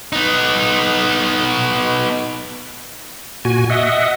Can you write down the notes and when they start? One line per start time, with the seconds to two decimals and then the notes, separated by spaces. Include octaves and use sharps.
0.13 B3 D#4
3.45 A#2 F#4 G#5
3.70 D#5 E5 F#5